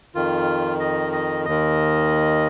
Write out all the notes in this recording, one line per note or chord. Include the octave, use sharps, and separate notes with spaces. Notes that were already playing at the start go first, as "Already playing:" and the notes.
F2 D#3 F4
D#5
D#5
D#2 D#3 D#5